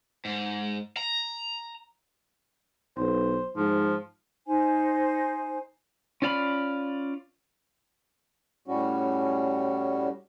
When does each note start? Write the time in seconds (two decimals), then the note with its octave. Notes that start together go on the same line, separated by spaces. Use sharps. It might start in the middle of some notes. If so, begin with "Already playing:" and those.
0.25 G#2
0.97 A#5
2.97 B1 C5
3.56 G#2 F3
4.47 D#4 C5 G#5
6.22 C#4 F4 D5 F5 B5
8.68 A2 G3 C#4 F#4